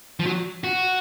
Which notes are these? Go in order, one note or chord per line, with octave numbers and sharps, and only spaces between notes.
F3
F#3
F#4